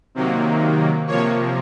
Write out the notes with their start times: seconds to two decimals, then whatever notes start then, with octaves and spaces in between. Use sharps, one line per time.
0.15 C3 D#3 F#3 A#3
1.07 C3 F3 A#3 C#5